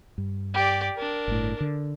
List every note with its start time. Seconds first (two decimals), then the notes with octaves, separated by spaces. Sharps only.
0.18 G2
0.54 G4 D5
0.95 D4 A#4
1.28 G1 A2
1.61 D3